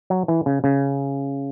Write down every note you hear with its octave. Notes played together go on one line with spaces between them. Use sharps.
F#3
E3
C#3
C#3